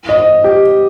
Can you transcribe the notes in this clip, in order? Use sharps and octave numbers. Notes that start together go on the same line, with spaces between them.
D#5
G4